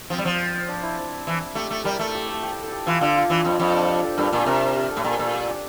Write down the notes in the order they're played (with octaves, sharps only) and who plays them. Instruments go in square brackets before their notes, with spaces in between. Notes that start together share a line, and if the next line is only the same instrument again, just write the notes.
[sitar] F3 [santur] C4
[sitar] G3
F3
[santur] D4
E4
[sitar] E3
[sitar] A3 [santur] G4
[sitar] A3
[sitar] G3 [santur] A#4
[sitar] A3 [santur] A4
[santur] G4
A4
G4
A4
A4
G4
[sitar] E3 [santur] F4
[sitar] D3 [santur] F4
[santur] F4
[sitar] E3 [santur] D4
[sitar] F2 [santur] C4
[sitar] F2 [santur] D4
[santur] D4
G4
A4
[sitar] G2 [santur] A#4
[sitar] A#2
[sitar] C3 [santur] A#4
[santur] G4
A4
[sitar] A2
[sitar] A#2 [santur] A#4
[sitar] A#2 [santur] A4
[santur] G4
D4